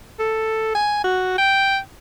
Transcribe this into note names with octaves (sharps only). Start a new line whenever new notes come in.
A4
G#5
F#4
G5